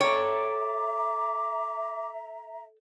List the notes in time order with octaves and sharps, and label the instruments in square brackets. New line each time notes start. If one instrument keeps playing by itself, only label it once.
[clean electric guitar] A4 D5 G5 [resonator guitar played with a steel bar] C#5 [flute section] E5 A#5 [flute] D6